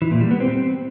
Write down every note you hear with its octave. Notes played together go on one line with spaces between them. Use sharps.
E3
A#2
G3
B3
C4